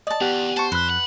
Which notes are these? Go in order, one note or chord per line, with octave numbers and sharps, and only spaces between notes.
D5 D#5 A5
E2 B3 G4 F#5
C5 A5 C#6
F2 B4 F#6
F#5